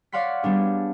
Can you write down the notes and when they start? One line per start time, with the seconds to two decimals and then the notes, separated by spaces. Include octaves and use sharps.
0.12 C#5 D5 F5 F#5 C6 B6
0.43 G3 B3 D4 G#4